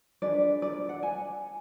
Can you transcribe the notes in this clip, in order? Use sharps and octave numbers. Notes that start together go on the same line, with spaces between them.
D4 G#4 B4 D5
D5
F#5
G#5